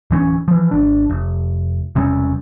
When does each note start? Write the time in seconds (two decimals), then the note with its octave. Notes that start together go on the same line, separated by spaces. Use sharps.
0.11 D1 E3 C4 C#4
0.48 E3 F3
0.71 G#1 D4
1.10 F1
1.95 E1 C3 G3 C#4